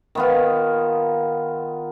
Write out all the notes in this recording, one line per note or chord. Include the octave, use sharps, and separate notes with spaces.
D#3 B3 F4